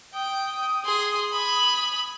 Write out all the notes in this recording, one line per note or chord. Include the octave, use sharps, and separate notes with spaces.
G5 D#6
G#4 C6
G#5 B5